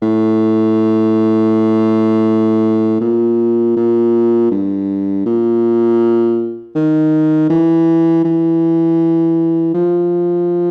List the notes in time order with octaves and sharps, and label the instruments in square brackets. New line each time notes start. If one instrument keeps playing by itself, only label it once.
[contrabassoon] A2
A#2
A#2
G2
A#2
D#3
E3
E3
F3